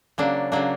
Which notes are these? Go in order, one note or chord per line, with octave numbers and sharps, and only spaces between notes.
C#3 F#3 A#3 D4
C#3 F#3 A#3 D4